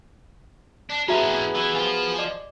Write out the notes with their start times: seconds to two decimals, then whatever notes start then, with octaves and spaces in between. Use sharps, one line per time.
0.90 D4
1.08 E3 B3 C#4 F#4 G#4 E5 A5 A#5
1.55 E3 G4
1.75 F4 C5 G#5
2.18 D5 D#5 D6